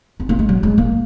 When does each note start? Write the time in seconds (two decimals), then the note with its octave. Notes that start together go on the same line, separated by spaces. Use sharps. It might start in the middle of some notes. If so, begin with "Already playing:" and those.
0.20 C4
0.29 A#3
0.39 G#3
0.49 F#3
0.63 G#3
0.78 A#3